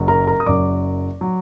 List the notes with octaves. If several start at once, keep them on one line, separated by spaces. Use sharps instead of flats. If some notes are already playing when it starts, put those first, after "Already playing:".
Already playing: F#1 F#2 F#3
A#4 A#5
A#4 A#5
D#6
F#1 F#2 F#3 D5 D6
F#3